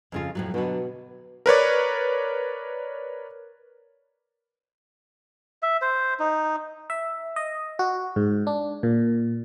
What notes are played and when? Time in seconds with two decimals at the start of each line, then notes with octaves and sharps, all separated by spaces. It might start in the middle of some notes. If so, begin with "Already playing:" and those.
0.12 F2 C#3 F4
0.35 F2 A2 F#3
0.54 B2 D3 F#3
1.46 A#4 B4 C#5 D5
5.62 E5
5.82 C5
6.20 D#4
6.90 E5
7.36 D#5
7.79 F#4
8.16 G#2
8.47 D4
8.83 A#2